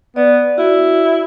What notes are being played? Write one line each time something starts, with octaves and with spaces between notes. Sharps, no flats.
B3 D5
E4 F#4